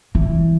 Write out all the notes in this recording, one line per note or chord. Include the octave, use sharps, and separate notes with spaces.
E3